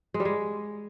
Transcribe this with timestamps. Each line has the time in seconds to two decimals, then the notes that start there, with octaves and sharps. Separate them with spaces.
0.14 G#3
0.20 G3
0.25 G#3